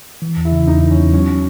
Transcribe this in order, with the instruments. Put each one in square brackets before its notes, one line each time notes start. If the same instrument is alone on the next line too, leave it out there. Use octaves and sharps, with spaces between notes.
[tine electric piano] E3
E2
[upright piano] E4
[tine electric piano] C#3
[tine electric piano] E2 [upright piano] D#4
[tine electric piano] E3
[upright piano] C#4
[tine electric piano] E2
[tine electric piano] F#3 [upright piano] C#4